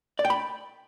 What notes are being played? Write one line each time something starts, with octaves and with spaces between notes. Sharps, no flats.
D5
G5
B5